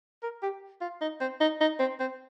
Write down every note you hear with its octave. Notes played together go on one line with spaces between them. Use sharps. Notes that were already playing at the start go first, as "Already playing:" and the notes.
A#4
G4
F4
D#4
C4
D#4
D#4
C4
C4